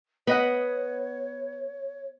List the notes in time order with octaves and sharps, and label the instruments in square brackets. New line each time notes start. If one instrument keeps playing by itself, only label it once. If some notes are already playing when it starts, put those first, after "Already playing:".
[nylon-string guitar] B3 [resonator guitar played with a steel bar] B4 D#5 F#5 [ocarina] C#5